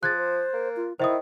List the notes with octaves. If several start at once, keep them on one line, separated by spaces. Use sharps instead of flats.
F3 G#4 F#6 G#6 A6
C5
A#3
F4
D#3 E4 C5 E5 D#6